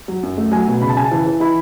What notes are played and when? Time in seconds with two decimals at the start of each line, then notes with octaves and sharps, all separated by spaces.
0.08 F#3
0.23 F#2
0.37 A3
0.52 F#3 G#5
0.67 B2
0.82 C#3 B5
0.89 A5
0.97 C#3 G#5
1.05 A5
1.12 E3
1.26 E3
1.40 E4 B5